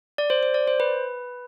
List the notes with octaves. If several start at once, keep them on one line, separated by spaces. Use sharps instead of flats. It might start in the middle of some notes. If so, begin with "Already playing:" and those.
D5
C5
C5
D5
C5
B4